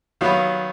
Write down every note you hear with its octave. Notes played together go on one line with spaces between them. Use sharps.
D#3 F#3 B3 F5